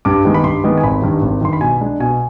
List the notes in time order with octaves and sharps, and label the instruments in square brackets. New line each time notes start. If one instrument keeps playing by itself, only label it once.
[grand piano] G2 D6
D#3 G#3 B3
B5
G2 C6
D#3 G#3 B3
G#5
G#1 B5
G2 D#3
G#1
G2 D#3 C6
B5
B2 G#5
G#3 D4
B2 G#5